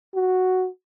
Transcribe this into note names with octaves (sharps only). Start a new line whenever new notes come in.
F#4